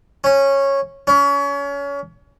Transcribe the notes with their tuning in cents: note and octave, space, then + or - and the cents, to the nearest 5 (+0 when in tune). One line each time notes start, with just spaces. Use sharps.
C#4 -10
C#4 +30